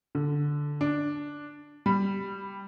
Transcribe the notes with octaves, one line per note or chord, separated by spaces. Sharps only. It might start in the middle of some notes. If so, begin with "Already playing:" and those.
D3
D4
G3 B5